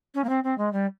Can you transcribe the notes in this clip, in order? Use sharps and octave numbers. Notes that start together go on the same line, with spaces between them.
C#4
A#3
C4
C4
G#3
G3